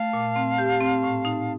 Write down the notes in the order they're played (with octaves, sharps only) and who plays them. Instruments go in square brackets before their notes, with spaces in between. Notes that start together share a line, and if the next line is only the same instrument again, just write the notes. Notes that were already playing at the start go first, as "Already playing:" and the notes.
Already playing: [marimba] A3 [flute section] F5 A5
[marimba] A#2
C4
G4
C4
A2
D#4